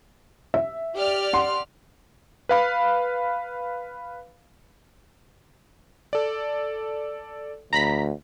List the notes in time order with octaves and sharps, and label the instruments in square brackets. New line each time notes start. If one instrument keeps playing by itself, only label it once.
[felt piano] E5
[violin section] G4 D5 F6
[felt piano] F#5 C6
[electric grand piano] B4 F5 B5
A4 D5
[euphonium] D2 [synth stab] A#5 B5 B6